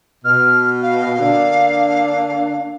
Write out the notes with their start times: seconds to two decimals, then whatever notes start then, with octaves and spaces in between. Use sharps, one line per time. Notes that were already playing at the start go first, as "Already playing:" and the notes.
0.25 B2 F6
0.82 F5
1.20 D3 A#3 D4